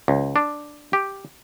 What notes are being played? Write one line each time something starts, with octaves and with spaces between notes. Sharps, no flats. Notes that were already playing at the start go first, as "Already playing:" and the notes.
C#2
D4
G4